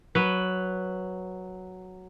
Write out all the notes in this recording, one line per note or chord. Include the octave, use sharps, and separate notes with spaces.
F#3 B4